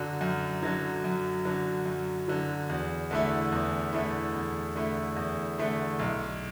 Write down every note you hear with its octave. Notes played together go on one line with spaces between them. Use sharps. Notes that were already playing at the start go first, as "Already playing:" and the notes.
Already playing: F#2 D3 F#3
F#2
D3 F#3
F#2
D3 F#3
F#2
D3 F#3
E2
D3 A3 E4
E2
D3 A3 E4
E2
D3 A3 E4
E2
D3 A3 E4
B1